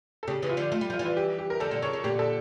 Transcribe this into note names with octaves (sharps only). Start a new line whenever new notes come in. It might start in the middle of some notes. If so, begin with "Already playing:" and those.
A4
C#3 G4
C#3 E3
F4
D3 F3
A3 F4
G3
F3 F4
E3 G3
F4
G4
G4
A#4
D3 F3 A4
A#2 D3
C#3 C#5
C#3
A#2 D3 G4
A4